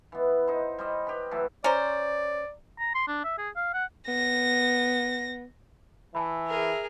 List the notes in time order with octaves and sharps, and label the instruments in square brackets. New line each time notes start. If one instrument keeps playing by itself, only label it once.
[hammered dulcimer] E3 B3
D#4 C5
G3 C5 D#5
G4 B4 B5
E3 F#3 A3
[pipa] C#4 C5 [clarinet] D5 [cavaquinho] A#5
[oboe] A#5
C6
D4
E5
G#4
F5
F#5
[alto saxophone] B3 [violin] A#6
[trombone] E3 [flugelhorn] E5 [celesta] G#5 A5 B5
[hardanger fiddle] G#4 A#4